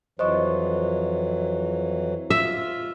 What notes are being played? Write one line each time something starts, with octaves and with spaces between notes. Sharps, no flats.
F2 E3 F#3 C5 D#5 C#6
F4 E5